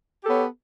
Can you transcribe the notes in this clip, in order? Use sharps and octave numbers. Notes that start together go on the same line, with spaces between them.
B3 G4 A4 C#5